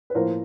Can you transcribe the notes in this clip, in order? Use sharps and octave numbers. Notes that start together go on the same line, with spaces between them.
B4
A2 F3 A#3 A#4 C5